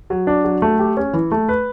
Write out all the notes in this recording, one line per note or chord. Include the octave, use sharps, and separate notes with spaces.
F#3
D4
F#3
A3
G4
C#4
E3
A3
B4